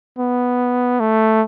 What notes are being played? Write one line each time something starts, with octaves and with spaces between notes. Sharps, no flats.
B3
A3